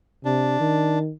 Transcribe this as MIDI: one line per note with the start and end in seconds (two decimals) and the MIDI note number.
0.25 0.58 48
0.25 0.99 62
0.60 1.12 51